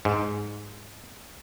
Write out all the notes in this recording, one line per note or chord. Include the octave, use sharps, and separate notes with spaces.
G#2